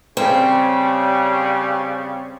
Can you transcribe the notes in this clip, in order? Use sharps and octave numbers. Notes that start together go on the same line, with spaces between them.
C#3 G3 C4